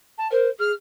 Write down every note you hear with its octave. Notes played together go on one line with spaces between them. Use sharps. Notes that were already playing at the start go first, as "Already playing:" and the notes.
A5
A#4 C5
G#4 F6